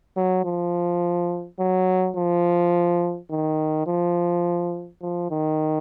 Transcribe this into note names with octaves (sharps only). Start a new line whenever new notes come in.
F#3
F3
F#3
F3
D#3
F3
F3
D#3